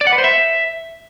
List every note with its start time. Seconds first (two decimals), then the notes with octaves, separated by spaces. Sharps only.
0.01 D5
0.07 F#5
0.12 B4
0.18 C5
0.24 E5